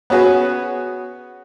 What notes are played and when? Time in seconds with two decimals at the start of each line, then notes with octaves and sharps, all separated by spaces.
0.10 B3 C#4 F#4 G#4 B4